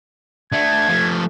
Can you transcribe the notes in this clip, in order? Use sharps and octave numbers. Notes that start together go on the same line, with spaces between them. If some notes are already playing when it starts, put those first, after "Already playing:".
D3 A3 G#6
F3 A3